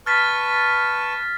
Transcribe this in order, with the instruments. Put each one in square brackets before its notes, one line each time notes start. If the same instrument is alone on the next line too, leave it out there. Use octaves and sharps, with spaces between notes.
[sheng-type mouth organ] B4 A5 C#6 [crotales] F6 A6 B6